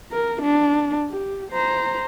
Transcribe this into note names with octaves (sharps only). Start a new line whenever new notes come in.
A#4
D4
G4
C5 A#5